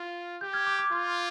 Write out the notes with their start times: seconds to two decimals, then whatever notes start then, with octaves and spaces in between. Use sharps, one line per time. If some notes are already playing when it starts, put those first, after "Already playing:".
Already playing: F4
0.41 G4 G6
0.53 F6 G#6
0.67 D6
0.79 D6
0.91 F4 C6